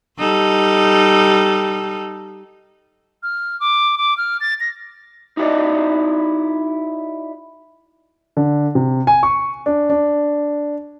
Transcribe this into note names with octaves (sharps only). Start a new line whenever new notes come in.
G3 D#4 A4
F6
D6
D6
F6
A6
A#6
D#4 E4 F#4 G#4 D5 D#5
D3
C3
G#5
C#6
D4
D4